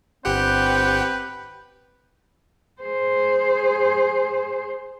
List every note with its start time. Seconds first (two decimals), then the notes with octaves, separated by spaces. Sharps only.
0.25 G1 C4 G4 B4 F#5 G5
2.82 G#4 C5